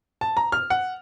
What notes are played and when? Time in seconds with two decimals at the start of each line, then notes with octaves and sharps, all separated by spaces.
0.21 A5
0.37 A#5
0.52 F6
0.70 F#5